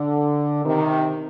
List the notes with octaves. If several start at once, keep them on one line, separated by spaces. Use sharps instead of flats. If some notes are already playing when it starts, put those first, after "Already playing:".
Already playing: D3
C3 D#3